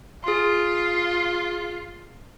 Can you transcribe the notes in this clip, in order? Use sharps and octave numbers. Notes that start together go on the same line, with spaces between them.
F4 G#4 C6